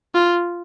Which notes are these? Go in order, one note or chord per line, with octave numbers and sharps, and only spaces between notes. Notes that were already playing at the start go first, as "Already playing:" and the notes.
F4